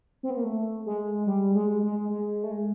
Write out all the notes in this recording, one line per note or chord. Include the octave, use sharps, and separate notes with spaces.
C4
B3
A#3
A3
G#3
G3
G#3
G#3
G#3
A3
G#3